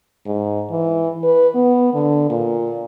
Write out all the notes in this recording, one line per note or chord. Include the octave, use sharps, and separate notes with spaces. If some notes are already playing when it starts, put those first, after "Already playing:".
G#2
E3
B4
B3
D3
A#2